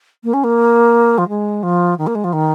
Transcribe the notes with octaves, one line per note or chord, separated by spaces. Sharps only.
A#3
C#4
A#3
F3
G#3
F3
D#3
A#3
G#3
F3
D#3